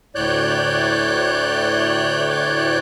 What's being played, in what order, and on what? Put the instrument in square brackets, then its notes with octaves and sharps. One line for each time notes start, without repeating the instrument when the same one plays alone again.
[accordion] D2 A2 C#5 D5 F#6 G6